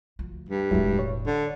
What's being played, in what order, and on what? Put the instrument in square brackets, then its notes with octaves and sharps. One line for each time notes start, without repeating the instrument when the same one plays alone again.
[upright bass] D2 F3
[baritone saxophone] G2
[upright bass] E1 A2 [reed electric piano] F#3 G#3 E4
[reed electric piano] C#5
[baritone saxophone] D3